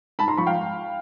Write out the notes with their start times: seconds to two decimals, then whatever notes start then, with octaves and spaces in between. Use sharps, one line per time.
0.19 G#2 A5 B5
0.28 A#5 C6
0.37 F3 B5 C#6
0.47 F5 G5